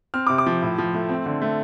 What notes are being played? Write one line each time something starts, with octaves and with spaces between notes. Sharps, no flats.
C4 F6
D6
C3
D6
F3
A2
F3
A3
C4
D3
A3